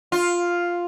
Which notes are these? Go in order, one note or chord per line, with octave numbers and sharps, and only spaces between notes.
F4